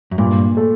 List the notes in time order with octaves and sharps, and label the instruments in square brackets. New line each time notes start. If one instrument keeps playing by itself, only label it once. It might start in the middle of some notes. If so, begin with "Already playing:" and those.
[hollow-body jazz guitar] F#2
[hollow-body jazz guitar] G2 [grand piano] A#2
[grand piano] A3